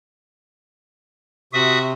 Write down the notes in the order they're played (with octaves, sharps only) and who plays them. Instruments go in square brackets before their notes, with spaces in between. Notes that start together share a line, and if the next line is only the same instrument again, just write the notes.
[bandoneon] C3 [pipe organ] F#4 E5 D#6